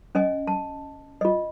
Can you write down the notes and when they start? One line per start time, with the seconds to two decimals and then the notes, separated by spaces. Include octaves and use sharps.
0.15 C#4 D#5 G#5
0.47 A5
1.21 F4 D#5